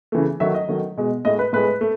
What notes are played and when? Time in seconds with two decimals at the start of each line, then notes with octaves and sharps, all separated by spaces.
0.12 C#3 E3 A3
0.40 D#3 F#3 A3 E5
0.54 D#5
0.69 D#3 F#3 A3
0.97 B2 G#3
1.25 A2 G#3 D#5
1.39 B4
1.53 A2 G#3 B4
1.81 A3